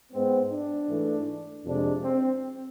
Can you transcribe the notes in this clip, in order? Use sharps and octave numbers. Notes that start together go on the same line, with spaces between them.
G#2 G#3 B3 C4
D4
G#2 E3 A3
F2 C3 G#3 D4
C4